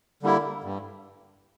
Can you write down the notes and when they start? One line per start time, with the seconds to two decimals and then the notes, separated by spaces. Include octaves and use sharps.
0.23 D3 G3 A#3 E4
0.64 G2